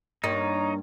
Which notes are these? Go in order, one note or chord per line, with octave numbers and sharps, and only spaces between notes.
G2 A#3 D#4 C#5 A#5